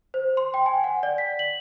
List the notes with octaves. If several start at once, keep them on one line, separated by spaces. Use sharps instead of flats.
C5
C6
G5
G#5
F#5
D5
B6
F#7